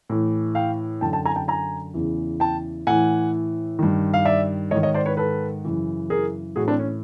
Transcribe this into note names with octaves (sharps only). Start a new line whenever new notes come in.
A2 E3
F5 G5
F#2 D3 G5 A5
G5 A5
G#5 A#5
G5 A5
G#5 A#5
E2 C#3 E3
G5 A5
A2 E3 F#5 G#5
G2 D#3
F5
D5 E5
G#2 D#3 C#5 D#5
C#5 D#5
C5 D5
B4 C#5
A4 B4
F#2 C#3 E3
G#4 A#4
A2 E3 F#4 G#4
C4 D4
C#4